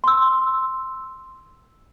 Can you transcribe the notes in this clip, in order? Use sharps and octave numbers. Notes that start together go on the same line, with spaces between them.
C6 E6